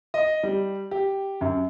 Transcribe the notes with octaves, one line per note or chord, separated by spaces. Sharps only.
D#5
G3
G4
F#2